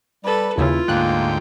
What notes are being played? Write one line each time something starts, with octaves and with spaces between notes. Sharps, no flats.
G3 A4 B4
D#2 C#3 E4 F4
D2 G#2 A#3 G5 F#6